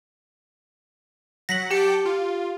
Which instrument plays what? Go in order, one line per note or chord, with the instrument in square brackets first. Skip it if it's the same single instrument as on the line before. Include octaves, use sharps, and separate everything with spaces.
[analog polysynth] F#3 F#5 [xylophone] A#6 B6 F#7
[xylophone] G4 C#7 [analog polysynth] G5 A5 D6
[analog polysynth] F4